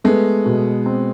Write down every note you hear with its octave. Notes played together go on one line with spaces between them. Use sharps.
G#3 A3 B3
B2
C4